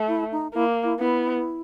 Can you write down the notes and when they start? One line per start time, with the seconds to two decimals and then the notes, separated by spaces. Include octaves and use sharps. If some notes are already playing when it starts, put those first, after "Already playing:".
Already playing: A3
0.08 E4
0.32 D#4
0.54 A#3 E4
0.84 E4
1.00 B3 E4